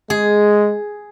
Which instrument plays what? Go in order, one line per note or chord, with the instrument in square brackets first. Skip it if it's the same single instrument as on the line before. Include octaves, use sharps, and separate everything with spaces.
[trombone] G#3 [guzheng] G#4